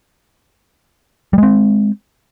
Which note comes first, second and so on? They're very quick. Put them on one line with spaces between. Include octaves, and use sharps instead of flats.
G3 G#3 C4